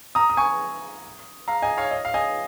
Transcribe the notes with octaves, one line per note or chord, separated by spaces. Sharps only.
A#5 D#6
D#6
G#5 C#6
F5 A#5
D#5 G#5
C#5 F5
D#5
F5
D#5 G#5